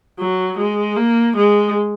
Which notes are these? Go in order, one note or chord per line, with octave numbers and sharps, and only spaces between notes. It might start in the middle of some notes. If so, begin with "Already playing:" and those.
F#3
G#3
A#3
G#3